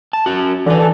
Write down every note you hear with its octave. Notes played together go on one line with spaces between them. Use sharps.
A5
C#4 F#4
D3 E3 B4
A4